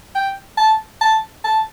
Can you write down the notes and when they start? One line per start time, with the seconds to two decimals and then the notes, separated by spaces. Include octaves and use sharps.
0.15 G5
0.58 A5
1.01 A5
1.44 A5